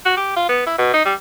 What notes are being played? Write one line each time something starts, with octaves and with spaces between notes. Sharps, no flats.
F#4
G4
F4
B3
E4
B2
D#4
G3